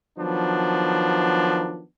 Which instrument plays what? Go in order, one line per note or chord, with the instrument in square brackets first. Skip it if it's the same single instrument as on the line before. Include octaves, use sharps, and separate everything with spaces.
[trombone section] D#3 F3 F#3 B3 D4